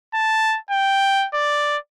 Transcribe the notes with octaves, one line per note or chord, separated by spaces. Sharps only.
A5
G5
D5